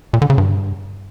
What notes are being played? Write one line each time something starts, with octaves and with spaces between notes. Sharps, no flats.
A#2
D3
C#3
G2